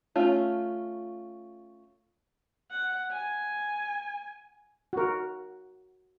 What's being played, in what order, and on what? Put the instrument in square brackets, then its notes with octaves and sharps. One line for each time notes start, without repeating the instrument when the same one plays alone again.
[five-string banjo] A3 C#4 F4
[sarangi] F#5
G#5
[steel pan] F#4 A#4